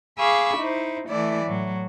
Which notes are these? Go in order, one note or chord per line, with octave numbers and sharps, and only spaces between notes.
G#4 F5 B5 C#6 D6 E6
D#4 E4 C5
E3 A3 E4 D5
A2 F#3